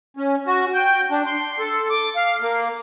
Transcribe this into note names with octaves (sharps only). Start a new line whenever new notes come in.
C#4
F#4
G5
D4
C6
A4
D6
F5
A#3